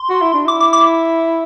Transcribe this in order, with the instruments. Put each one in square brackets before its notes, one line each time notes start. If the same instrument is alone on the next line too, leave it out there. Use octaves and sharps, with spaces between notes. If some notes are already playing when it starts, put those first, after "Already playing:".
Already playing: [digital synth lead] C6
[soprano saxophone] F#4
E4
D4
[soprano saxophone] E4 [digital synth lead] D6
[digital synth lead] D6
D6